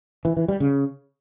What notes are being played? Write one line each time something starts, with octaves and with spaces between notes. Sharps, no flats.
E3
E3
G3
C#3